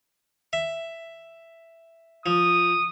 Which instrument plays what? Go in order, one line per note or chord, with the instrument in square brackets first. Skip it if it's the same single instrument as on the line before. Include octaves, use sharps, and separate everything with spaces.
[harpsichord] E5
[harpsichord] F3 [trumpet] D#6